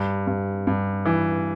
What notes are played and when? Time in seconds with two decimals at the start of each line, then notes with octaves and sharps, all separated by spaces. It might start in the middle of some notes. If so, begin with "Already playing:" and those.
Already playing: G2
0.27 G2
0.67 G2
1.05 E3